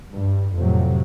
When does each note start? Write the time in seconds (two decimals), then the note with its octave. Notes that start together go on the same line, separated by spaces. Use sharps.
0.13 G2
0.55 F2 A2 C3 F#3